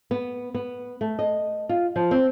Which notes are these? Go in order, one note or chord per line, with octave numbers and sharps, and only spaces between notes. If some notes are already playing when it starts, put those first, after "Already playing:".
B3
B3
A3
D#5
F4
F3
C4